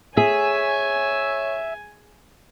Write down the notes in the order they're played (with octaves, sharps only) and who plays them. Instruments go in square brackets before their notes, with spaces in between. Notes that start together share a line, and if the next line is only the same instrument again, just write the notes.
[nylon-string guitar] G#4 [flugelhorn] C#5 [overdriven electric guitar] E5 [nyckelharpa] G#5